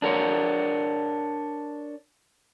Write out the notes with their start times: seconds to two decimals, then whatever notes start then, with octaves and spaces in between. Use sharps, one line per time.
0.02 D4 A#4 C#5